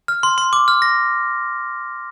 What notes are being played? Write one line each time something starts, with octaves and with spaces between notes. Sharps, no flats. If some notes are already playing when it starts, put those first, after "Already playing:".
F6
C6
C6
D6
F6
A#6